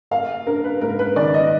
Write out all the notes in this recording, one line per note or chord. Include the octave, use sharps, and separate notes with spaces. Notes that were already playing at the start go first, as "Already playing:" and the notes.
A#3 F5
D4 A#4
B4
G#2 A#4
B4
D#3 D5
D#5